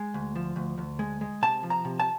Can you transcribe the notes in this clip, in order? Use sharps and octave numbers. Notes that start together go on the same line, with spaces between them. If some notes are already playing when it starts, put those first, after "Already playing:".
Already playing: G#3
D2
F3
D2
D2
G#3
G#3
C3 A5
F3
A#5
C3
A5